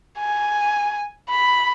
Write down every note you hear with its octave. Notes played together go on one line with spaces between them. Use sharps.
G#5
B5